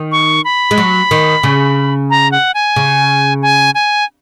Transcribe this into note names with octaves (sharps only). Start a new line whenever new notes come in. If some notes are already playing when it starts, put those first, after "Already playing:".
Already playing: D#3
C#6
B5
G#3
F#3
D#3
C#3
A#5
F#5
G#5
C#3
G#5
G#5